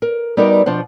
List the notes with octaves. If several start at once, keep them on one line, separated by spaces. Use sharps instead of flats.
A#4
G3 B3 D#4 F#4 A#4 D5
B2 F3 D4 C5 F#5